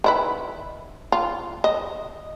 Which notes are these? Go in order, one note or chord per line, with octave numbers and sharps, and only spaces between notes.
D#3 E4 B4
F4
D#5